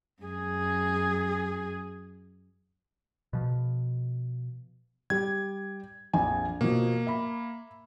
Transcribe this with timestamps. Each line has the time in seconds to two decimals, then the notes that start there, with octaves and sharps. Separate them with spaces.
0.22 F#2 G#4
3.33 B2 F3
5.10 G3 G4 G#6
6.13 A#1 F2 G#5
6.61 B2 F3 A#3
7.07 E5 B5